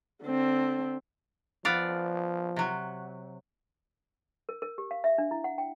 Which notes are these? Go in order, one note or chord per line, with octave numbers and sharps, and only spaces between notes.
D3 C4
F3 B3 D5 F5
C3 F#3
A#4
A#4
G4
F5
E5
D4
E4
F#5
G5